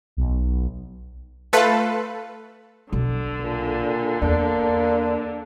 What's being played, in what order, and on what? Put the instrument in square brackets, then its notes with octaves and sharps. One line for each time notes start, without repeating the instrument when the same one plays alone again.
[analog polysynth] B1
[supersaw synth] A3 A4 B4 [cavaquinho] F4 A5
[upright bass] B1 [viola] D3
[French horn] A#2
[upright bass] E2 [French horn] A#3 [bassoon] D4